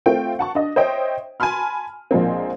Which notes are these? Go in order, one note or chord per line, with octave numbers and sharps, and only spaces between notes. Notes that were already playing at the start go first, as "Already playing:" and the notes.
A3 C4 F4 G5
F#5 A5 C#6
D4 D#5
C5 C#5 D#5 E5 G5
G#5 A5 B5 C6 F6
A#1 F3 G#3 A#3 C4